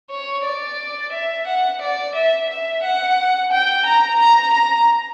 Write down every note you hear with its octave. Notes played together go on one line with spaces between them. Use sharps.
C#5
D5
E5
F#5
D5
E5
E5
F#5
G5
A#5
A#5
A#5